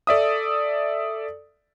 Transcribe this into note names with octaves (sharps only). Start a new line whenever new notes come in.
A4 D5 E5 D#6